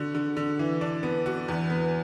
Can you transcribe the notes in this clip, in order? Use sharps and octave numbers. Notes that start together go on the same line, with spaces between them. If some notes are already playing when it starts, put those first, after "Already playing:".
Already playing: D3 F#4
D3
D3
E3
D4
B3
F#4
E2
B3